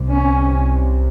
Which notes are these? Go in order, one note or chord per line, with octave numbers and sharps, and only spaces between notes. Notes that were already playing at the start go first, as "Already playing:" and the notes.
Already playing: C2 C3
C#4